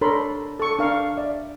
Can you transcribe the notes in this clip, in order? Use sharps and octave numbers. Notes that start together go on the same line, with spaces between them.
D4 A4 A#4 C#5 B5 C6
A4 C#6
D4 A#4 F5 C#6
D5 E5